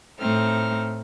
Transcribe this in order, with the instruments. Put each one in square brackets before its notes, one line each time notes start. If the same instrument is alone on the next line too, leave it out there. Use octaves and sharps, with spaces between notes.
[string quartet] A2 A3 C4 D#4 F6